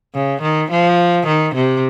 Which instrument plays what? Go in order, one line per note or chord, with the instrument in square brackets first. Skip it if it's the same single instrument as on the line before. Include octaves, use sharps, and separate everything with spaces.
[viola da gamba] C#3
D#3
F3
D#3
C3